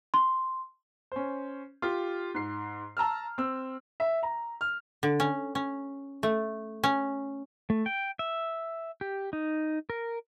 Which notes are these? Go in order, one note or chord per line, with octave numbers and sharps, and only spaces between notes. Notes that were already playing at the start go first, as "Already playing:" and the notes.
C6
C#4 C5
F4 G4
G#2 C7
A5 A#5 E6 F6
C4 E6
E5
A#5
F6
D3
C#4
C#4
A3
C#4
A3
G5
E5
G4
D#4
A#4